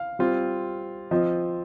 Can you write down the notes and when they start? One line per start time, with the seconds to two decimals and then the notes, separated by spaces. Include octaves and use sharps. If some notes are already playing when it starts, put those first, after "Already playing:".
Already playing: F5
0.19 G3 C4 F4
1.11 F3 C4 F4 D#5